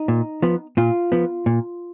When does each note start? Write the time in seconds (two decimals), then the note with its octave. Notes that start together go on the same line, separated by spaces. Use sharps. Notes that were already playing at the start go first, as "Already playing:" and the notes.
Already playing: D#4
0.08 A#2
0.42 F3 B3
0.77 A#2 F4
1.12 F3 B3
1.46 A#2